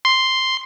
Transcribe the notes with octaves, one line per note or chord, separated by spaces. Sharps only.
C6